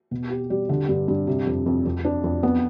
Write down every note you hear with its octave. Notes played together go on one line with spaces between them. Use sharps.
B2
G4
G3
D3
G2
G2
C3
F2
F2
F2
D4
F2
B3